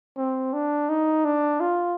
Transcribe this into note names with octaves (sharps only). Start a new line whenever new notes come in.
C4
D4
D#4
D4
F4